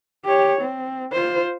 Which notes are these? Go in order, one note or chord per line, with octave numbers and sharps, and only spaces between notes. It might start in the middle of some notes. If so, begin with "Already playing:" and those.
G4 C#5
C4
F4 C5